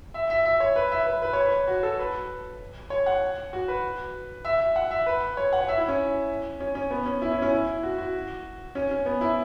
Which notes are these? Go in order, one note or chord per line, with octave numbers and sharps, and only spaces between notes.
E5
E5
E5
C#5
B4
E5
B4
B4
C#5
B4
F#4
A4
B4
C#5
F#5
F#4
B4
E5
E5
F#5
E5
B4
C#5
F#5
C#5
E5
E4
C#4
C#4
C#4
B3
C#4
E4
C#4
C#4
E4
F#4
F#4
C#4
C#4
B3
E4